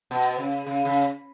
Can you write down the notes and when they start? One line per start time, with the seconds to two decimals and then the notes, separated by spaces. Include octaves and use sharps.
0.11 B2
0.38 C#3
0.67 C#3
0.85 C#3